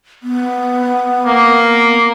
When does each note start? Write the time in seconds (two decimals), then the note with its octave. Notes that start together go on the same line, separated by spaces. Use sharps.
0.23 B3
1.26 A#3